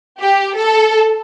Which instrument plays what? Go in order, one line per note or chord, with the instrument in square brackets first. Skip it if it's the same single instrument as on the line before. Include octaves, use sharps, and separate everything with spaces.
[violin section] G4
A4